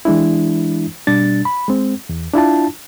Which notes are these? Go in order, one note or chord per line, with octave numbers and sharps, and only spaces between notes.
E3 G#3 D4 E4
B2 G3 D4 A6
B5
G#3 C4
E2
D4 E4 F4 A5